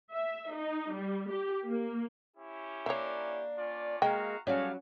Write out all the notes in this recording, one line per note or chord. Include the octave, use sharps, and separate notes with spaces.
E5
D#4
G3
G4
A#3
C#4 E4 G4
A#3 D4 C#5 E5
C#4 F4 D5
G#3 A#3 F#4 F5 G5 A#5
F#3 G3 C#4 F#4 G#4 A4 C#5 F5